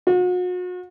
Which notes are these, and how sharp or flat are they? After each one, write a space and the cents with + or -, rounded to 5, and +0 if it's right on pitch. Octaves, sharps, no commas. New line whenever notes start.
F#4 -40